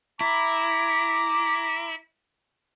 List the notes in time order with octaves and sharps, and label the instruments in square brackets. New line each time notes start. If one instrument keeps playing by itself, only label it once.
[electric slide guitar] E4 [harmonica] A#5 D6